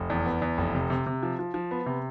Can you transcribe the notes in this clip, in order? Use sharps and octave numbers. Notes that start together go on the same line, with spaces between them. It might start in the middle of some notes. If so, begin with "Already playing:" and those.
Already playing: F1
E2
B3
E2
F1
C3
C3
C3
F3
F3
F3
B3
C3